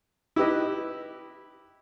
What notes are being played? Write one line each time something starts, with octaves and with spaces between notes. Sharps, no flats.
E4 G4 B4 D#5